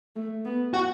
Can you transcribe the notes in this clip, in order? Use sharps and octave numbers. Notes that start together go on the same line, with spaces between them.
A3
B3
F#4